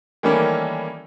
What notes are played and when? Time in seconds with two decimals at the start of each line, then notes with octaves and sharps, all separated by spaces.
0.23 D#3 E3 G3 A3 A#3 C#4